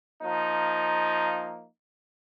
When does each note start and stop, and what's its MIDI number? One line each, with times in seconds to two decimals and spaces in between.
0.23 1.67 53
0.23 1.67 58
0.23 1.67 63